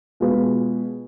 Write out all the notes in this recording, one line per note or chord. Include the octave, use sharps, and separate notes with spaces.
B2 G#3 B3 F4 G#4 B4